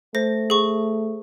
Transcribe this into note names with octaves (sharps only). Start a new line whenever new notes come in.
A3 C5 A#6
G#4 C#6